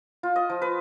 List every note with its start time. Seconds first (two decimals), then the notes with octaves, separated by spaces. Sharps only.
0.23 F4
0.36 D#5
0.49 F3
0.62 B4